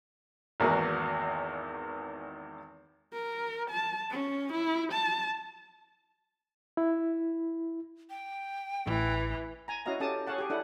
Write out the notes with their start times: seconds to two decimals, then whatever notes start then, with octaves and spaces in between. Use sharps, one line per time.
0.60 G#1 E2 D#3 E3 A#3 F#4
3.13 A#4
3.70 A5
4.10 C#4
4.52 E4
4.92 A5
6.77 E4
8.10 G5
8.87 A1 E3
9.68 G#5 A#5
9.86 C#4 E4 F#4 D#5 F5 A#5
10.00 C#4 G4 A4 A5 D#6
10.27 G#4 C#5 F5 F#5 A5
10.38 G4 G#4
10.50 D4 E4 A4 F#5